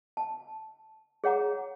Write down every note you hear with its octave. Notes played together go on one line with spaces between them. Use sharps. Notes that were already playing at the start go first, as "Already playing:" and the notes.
A5
G#4 C#5 F#5 A#5 D6